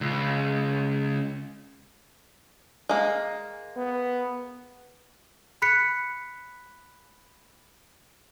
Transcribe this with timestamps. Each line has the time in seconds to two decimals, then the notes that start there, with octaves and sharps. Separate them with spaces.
0.01 C#2
2.89 G#3 A#3
3.77 B3
5.62 B5 F#6 B6 C#7